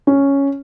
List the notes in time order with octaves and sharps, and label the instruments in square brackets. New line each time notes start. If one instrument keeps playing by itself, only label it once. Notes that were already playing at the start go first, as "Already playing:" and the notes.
[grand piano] C#4